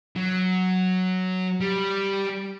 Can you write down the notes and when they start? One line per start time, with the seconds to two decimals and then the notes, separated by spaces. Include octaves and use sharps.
0.16 F#3
1.61 G3